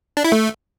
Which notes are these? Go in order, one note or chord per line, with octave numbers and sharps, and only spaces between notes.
D4
E4
A3